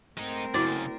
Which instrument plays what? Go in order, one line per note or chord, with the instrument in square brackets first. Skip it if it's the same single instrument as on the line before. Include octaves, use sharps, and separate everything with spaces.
[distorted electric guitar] G#3 D#4 [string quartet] A3 C4 A#4
[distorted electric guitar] F#2 C#3 [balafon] E4 F#4 [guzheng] D5